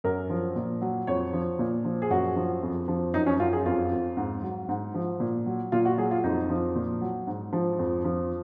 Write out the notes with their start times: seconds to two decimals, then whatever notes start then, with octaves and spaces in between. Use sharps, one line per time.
0.04 F#2 A#4
0.30 F3
0.56 A#2
0.81 F#3
1.07 F2 C#5
1.33 F3
1.59 A#2
1.85 F3
2.02 G#4
2.10 F#2 F#4
2.36 F3
2.62 F2
2.88 F3
3.14 F#2 D#4
3.26 C#4
3.40 F#2 F4
3.53 G#4
3.66 F2 F4
3.92 F2
4.17 G#2
4.43 F#3
4.69 G#2
4.95 F3
5.20 A#2
5.46 F#3
5.72 A#2 F4
5.85 F#4
5.98 F#3 G#4
6.11 F4
6.24 F2 D#4
6.49 F3
6.75 A#2
7.01 F#3
7.27 G#2
7.53 F3
7.79 F2
8.04 F3